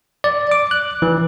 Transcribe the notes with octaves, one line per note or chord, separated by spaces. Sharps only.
D5
D6
F#6
E3